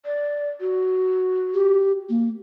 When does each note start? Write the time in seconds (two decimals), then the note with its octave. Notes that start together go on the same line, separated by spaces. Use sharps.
0.06 D5
0.61 F#4
1.54 G4
2.10 A#3